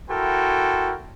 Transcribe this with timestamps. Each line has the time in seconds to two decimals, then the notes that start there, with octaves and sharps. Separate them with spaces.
0.10 E4 F#4 A4 A#4 G5 C6